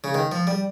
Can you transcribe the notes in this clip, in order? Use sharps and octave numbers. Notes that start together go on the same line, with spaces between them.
C#3
D#3
F3
G3